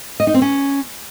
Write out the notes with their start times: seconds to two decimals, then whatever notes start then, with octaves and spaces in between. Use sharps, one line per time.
0.20 D#5
0.27 D#4
0.34 C4
0.42 C#4